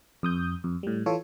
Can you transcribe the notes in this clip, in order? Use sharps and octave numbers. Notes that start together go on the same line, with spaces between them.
F2 D#6 G6
F2
A2 G3
E3 F4 A4 C#5